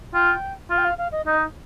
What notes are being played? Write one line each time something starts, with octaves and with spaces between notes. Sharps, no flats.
F4 G5
F4 F5
G5
F5
F5
D#5
D#4 D#5